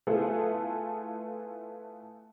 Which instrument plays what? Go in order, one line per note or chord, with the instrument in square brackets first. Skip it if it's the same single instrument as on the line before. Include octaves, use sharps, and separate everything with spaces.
[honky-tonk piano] A3 B3 E4 F4 G#4 A4